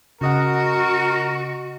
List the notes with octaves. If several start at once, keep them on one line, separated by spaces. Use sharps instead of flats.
C#3 F#4 A#4 D#5 F#5